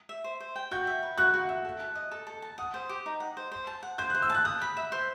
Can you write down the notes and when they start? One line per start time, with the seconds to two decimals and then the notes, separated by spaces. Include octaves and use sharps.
0.09 E5
0.24 C5
0.40 C5
0.56 G5
0.71 F#4 G6
0.87 E5
1.03 B4
1.18 F#4 F#6
1.34 F#4
1.49 E5
1.65 A4
1.80 A5
1.95 D#5
2.11 A4
2.27 A4
2.42 A5
2.58 F#5 D#6
2.74 C5
2.89 G4
3.06 D#4
3.20 F#5
3.37 C5
3.52 C5
3.67 A5
3.83 F#5
3.98 C5 G6
4.10 F#6
4.15 C5
4.22 E6
4.30 A5 F#6
4.45 D#6 F#6
4.62 B5
4.77 E5
4.92 C5